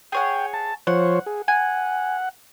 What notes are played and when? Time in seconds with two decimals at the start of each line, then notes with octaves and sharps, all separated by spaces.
0.12 G#4 C#5 F#5 G5
0.53 A5
0.87 F3 C5 C#5 F#5
1.26 G#4
1.48 F#5 G#5